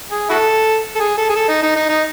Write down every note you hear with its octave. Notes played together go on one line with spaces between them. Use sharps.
G#4
E4 F#4 A4
A4
G#4
A4
G#4
A4
D#4
D#4
D#4
D#4